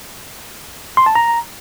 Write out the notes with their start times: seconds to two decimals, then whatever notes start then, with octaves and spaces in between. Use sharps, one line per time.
0.97 C6
1.06 A5
1.15 A#5